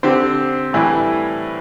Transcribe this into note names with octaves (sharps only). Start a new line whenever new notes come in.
D3 C4 G4 C5
A2 E3 G3